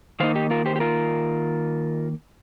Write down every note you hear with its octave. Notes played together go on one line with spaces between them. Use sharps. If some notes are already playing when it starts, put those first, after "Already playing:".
D#3 A#3 D#4 C5 F5
D#4 G4
F4 A#4
G4 C5
G4
F4 A#4